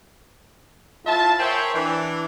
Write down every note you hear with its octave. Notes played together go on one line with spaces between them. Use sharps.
A2 F4 E5 A5
G#4 A#4 C5 C#5 E5 G5
E3 D4